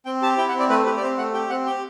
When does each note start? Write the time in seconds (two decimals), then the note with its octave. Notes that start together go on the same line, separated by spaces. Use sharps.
0.06 C4 G5
0.22 G4 A5
0.38 E4 G5
0.48 F#5
0.54 C4
0.59 D5
0.69 A3 B4
0.85 G4 B4
0.97 D5
1.02 C4 C5
1.18 A3 F#5
1.33 G4 G5
1.50 C4 F#5
1.66 G4 G5